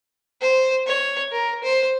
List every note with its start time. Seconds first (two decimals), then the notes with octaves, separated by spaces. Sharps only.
0.41 C5
0.87 C#5
1.32 A#4
1.63 C5